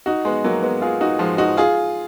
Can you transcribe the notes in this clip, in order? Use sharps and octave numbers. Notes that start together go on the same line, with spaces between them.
D#4 F#4
G#3 B3
F#3 A#3
G#3 B3
F4 G#4
D#4 F#4
F3 G#3
D#4 F#4
F4 G#4